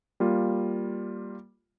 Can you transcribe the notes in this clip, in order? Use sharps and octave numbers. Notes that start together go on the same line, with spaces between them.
G3 A#3 F4